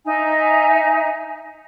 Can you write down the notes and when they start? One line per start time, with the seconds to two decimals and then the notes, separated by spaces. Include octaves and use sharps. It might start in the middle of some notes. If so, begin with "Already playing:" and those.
0.05 D#4 E5 G#5 A#5